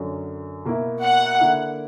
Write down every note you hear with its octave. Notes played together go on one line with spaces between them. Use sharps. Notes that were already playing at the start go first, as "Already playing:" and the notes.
Already playing: F#2 D3 F#3
B2 A#3 E4
F#5
D3 A#3 E4